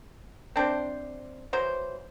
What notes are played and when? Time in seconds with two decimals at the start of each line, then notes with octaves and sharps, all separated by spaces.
0.56 C4 D4 E4 C5
1.53 E3 F#3 C5